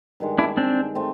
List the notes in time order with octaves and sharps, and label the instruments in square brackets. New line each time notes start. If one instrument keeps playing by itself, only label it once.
[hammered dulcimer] G2 D#3 G#3
[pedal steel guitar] D4 E4
C4 D4
[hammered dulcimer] A3 C4